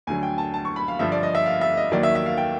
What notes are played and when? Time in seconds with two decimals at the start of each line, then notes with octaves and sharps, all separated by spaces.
0.07 D2 D3 F#3 G#5
0.23 G5
0.38 A5
0.54 A5
0.65 C#6
0.76 B5
0.88 F5
0.99 G2 D3 F3 E5
1.12 D5
1.23 D#5
1.35 E5
1.46 F5
1.61 E5
1.77 D#5
1.92 D#2 D#3 F#3 D5
2.03 E5
2.15 E5
2.26 F5
2.37 G5